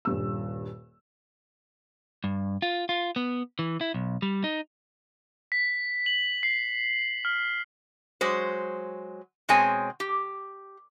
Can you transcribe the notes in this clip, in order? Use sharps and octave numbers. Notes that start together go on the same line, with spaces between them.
D#1 G2 E6
G2
F4
F4
B3
E3
E4
B1
G3
D#4
B6
F#7
C7
F6
F#3 G#3 C5
B2 G#3 C4 C#5 G#5
G4